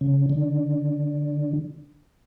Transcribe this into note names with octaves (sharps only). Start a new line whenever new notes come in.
C#3
D3